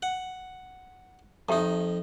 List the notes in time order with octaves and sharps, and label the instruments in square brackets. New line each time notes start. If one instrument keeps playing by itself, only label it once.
[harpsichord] F#5
[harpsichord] F2 D#4 [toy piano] G4 E5 A5